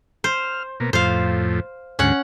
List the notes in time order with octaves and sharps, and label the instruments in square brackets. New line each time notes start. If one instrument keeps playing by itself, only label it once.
[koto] C5 [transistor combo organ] F6
[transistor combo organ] B2 A#3
[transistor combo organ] F2 A2 [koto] C5 F5
[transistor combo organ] D2 G#2 [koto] C#4 F#5